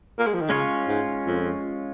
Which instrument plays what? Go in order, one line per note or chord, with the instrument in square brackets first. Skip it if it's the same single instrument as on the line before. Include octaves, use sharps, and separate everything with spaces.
[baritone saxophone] A#3
G#3
F3
D#3
[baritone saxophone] C#3 [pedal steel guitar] G#3 C#4 F4 C#5
[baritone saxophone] G#2
F2